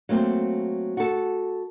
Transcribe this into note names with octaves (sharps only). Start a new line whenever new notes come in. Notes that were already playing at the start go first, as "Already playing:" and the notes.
F#3 A3 A#3 C4
F#4 A4